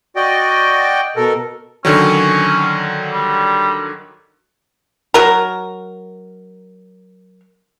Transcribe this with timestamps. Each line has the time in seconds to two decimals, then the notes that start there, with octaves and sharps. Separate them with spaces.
0.16 F#4 D5 D#5 G5
1.16 B2 A4 A#4
1.85 D3 D#3 F#3 C#4
3.12 G3
5.14 F#3 A#4